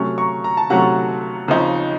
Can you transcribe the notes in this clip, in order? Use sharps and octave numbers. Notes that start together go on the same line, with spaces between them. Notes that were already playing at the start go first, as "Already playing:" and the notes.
Already playing: C3 F#3 A3 C#4
A#5 C#6
A#5
A5
C3 F#3 A3 C#4 F#5 A#5
D#2 C#3 F3 C4 D#4